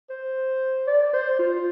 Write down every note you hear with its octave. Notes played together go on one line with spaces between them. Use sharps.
C5
D5
C5
F4